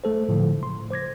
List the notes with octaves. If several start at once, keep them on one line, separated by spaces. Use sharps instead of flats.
A3 A4 C5
A2 D3 F3
C#3 C6
C5 D6 G#6 A#6